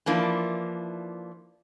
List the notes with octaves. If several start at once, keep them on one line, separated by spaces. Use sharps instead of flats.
E3 F3 A#3 D4